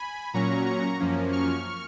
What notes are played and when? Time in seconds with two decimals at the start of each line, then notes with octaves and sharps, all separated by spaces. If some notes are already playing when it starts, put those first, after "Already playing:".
Already playing: G#5 B5
0.33 A#2 F#3 C#4 A#5 C#6
0.66 A#5 C#6
0.99 F#2 F3 A#3 C#4
1.32 C#6 F6